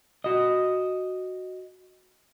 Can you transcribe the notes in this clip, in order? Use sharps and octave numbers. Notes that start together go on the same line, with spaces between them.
F#4 D#5